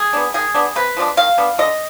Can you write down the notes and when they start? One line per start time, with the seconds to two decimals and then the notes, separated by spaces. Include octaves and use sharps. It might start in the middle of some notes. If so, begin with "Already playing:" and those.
Already playing: G#4
0.13 B3 D4
0.34 D#3 G#4
0.55 B3 D4
0.76 C3 B4
0.97 F3 G#3 D4
1.17 D#3 F5
1.38 B3 D4
1.58 D3 D#5